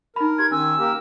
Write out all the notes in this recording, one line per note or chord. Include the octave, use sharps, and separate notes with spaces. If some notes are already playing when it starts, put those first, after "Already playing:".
D#4 A#4 B5
G4 C6 G#6
D#3 C#4 G#5 E6
A#3 G4 A#4